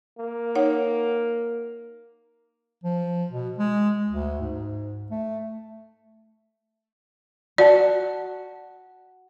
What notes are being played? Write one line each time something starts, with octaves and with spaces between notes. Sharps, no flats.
A#3
D#4 C#5 F#5
F3
B2
G#3
D2
G#2
A3
F#4 D5 F#5 A5